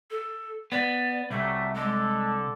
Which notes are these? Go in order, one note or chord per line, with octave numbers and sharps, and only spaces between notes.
A4
B3 D5
C2 F#3 G3 A3 E5
D3 G#3 A4